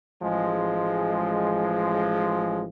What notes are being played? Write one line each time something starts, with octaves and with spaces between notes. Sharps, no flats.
A1 F3 G#3